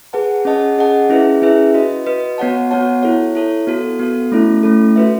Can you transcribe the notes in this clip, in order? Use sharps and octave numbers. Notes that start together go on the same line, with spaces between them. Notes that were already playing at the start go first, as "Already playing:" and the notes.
G#4 B4 F#5 A5
C#4 G#4 D#5 F#5 A5
C#4 G#4 D#5 F#5 A5
C#4 E4 G#4 B4 E5
C#4 E4 G#4 B4 E5
F#4 B4 D#5
F#4 B4 D#5
B3 F#4 C#5 F#5 A5
B3 F#4 C#5 F#5 A5
E4 A4 C#5
E4 A4 C#5
B3 F#4 A4
B3 F#4 A4
A3 C#4 E4 A4
A3 C#4 E4 A4
F#4 B4 E5